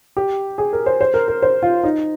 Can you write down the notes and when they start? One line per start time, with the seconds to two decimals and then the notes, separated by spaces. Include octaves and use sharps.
0.17 G4
0.58 G#4
0.73 A#4
0.86 C5
1.01 C5
1.14 A#4
1.28 A#4
1.42 C5
1.63 F4
1.84 D#4